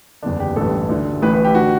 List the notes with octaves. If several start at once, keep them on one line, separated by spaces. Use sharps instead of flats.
F#1 E2 D3 D4
G4
A1 G2 E3 A4
D2 D3
A1 A2 E3 B4
B4
G4
D3 F#4